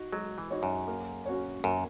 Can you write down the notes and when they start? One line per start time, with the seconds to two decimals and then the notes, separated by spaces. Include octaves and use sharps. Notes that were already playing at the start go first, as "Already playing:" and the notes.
Already playing: D#4 F#4
0.13 F#3 G#3
0.38 E3
0.51 D#4 F#4 C#5
0.63 F#2
0.88 A#3
1.26 C#4 F#4 C#5
1.64 F#2 A#3